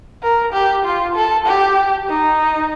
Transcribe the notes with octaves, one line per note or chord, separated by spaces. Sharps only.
A#4
G4
F4
A4
G4
D#4